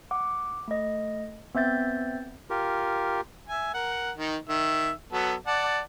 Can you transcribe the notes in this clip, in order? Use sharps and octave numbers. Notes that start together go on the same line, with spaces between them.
F#5 D6
A3 D#5
B3 C4 E5 G6 A6
F4 G4 A#4
E5 G#5
A#4 F#5
D#3 D#4
D#3 E5
F#3 B3 A4
D5 F#5 A5